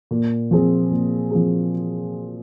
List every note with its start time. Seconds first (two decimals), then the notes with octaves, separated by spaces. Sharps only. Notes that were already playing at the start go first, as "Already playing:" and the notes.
0.11 A#2
0.51 F3 C4 G#4
0.91 A#2
1.31 F3 C4 G#4